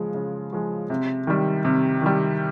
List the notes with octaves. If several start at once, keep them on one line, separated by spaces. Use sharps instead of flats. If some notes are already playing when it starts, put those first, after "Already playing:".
Already playing: C#3 F3 G#3
C#3
F3 G#3
C3
D#3 G3
C3
D#3 G3